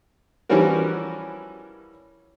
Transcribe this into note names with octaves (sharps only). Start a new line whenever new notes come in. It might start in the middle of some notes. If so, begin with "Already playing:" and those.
E3 F3 G3 C#4 F#4 A#4